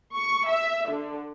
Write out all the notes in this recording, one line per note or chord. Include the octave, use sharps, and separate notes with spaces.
C#6
E5
D3